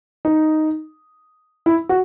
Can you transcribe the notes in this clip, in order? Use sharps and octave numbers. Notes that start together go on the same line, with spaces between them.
D#4
E4
F#4